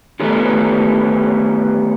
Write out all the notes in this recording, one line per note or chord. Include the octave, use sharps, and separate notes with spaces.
D#3 E3 G3 A3 B3